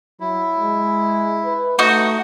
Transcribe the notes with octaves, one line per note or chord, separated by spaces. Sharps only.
F#3 E4
G#3
B4
A3 D#4 F#4